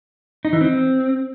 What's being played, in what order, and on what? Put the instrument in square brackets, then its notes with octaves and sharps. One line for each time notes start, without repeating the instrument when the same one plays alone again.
[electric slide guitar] D#4
E3
C4